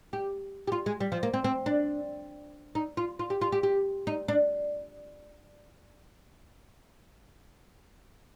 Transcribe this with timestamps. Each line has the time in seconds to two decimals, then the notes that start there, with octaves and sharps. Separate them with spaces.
0.13 G4
0.67 G4
0.72 F4
0.86 G#3
1.00 G3
1.12 F3
1.23 A#3
1.34 C4
1.44 C4
1.66 D4
2.75 D#4
2.97 F4
3.19 F4
3.30 G4
3.41 F4
3.52 G4
3.63 G4
4.07 D#4
4.28 D4